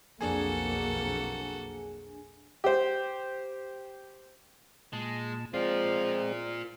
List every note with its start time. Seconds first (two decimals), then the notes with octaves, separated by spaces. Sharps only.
0.21 B1 F2 A#3 D4 F#4 G#4 A4 G#5
2.64 G4 C5
4.93 A#2 G#3 A5
5.54 F3 G#3 C4 F4 A#4 D5